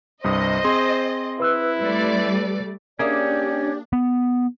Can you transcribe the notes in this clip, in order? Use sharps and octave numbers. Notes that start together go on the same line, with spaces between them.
C2 G2 C5 D#5 D#6
C4 G#4 C6
E4 B4 E6 F#6
G3 A3 D5
A#3 C#4 D4 G4 G#4 D5 E5
B3